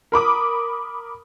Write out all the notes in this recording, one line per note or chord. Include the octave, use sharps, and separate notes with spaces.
A#4 B5 D6 D#6